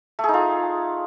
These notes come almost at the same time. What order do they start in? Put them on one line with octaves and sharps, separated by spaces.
A3 G#4 D#4 F4